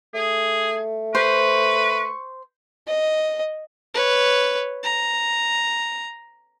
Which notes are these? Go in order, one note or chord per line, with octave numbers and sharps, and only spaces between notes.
A3 G#4
B4 C5 C#6
D#5
B4 C#5
A#5